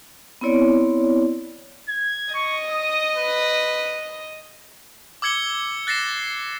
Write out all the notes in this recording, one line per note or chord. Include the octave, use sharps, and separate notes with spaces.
B3 C4 E4 C#5 D5
G#6
D#5 C#6
D#6
B4
D6 E6 G#6 C#7 G7
F#6 A6 A#6 C7 E7